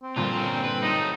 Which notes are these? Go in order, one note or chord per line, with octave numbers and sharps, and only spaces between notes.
C4
G2 A#2 D3 F3 F4
G3 A#3 C#4
B4
F#3 A3 D#4